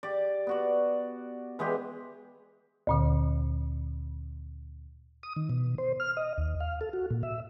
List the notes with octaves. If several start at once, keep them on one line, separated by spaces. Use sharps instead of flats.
G4 D5
B3 F#4 D5
E3 G#3 B3 G4
D2 A#2 D3
D#6
D#3
B2
C5
F6
D#5
D#2
F5
A4
F#4
A#2
E5